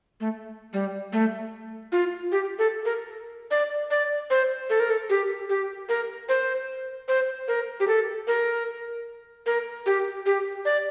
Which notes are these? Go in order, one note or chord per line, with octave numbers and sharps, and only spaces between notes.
A3
G3
A3
F4
G4
A4
A#4
D5
D5
C5
A4
A#4
A4
G4
G4
A#4
C5
C5
A#4
G4
A4
A#4
A#4
G4
G4
D5